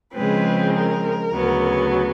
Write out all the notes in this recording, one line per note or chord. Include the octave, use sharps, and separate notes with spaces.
C#3 F3 G#3 C4 B4
A#4
D2 C#3 F#3 B3